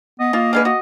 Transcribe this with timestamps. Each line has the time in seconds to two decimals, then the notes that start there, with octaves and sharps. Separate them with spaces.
0.20 B3 D#5
0.33 A#3 F4
0.53 D3 G#3 B4 F5
0.65 F#4 D#5